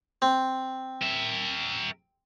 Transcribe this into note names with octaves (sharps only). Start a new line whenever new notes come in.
C4
A#4 E5